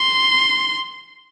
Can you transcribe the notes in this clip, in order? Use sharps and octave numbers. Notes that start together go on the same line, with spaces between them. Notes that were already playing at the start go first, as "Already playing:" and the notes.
Already playing: C6